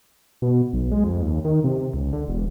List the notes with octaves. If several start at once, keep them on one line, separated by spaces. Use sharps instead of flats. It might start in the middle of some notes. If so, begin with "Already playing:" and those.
B2
B1
G#3
F2
D#2
D#3
C3
C#2
D3
E1